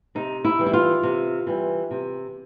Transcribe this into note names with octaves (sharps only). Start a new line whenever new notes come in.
C3 D#4
E4
E3 G3
E4
F4
C3
E3 G3
C3